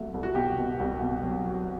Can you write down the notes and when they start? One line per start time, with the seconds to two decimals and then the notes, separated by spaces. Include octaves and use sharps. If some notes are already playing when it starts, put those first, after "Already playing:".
Already playing: C2 F#3 A3
0.14 C2
0.23 F#4
0.35 B2 G4
0.58 B2
0.80 C2
1.01 B2
1.23 F#3
1.45 F#3